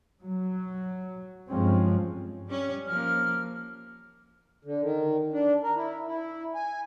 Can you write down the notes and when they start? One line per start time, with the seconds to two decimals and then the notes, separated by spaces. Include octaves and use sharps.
0.22 F#3
1.48 G2 F3 G3 G#3 C4 C#4
2.48 G3 C#4 C#5
2.87 F3 A#3 F6
4.65 D3
4.82 D#3
5.33 D4
5.63 A#4
5.76 E4
6.08 E4
6.55 G#5